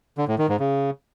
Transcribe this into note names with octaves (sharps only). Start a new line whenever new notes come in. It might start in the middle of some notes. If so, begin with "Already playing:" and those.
D3
A2
D#3
G#2
C#3